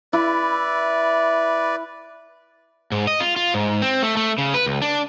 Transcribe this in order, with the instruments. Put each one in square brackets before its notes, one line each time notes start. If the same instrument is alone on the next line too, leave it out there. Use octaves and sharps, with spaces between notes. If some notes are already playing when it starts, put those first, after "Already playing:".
[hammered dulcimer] E4 [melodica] B4 D5
[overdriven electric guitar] G#2
D#5
F4
F4
G#2
C4
A3
A3
C#3
B4
C#2
D4